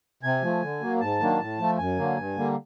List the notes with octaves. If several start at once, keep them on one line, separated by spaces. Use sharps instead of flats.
C3 G#5
F3 A3
D3
F#3 A#3
G#2 A5
D#3 F#3 A#3 D4
A2
F3 A3
F#2 G#5
D3 F#3 A#3
G2
D3 G3 A#3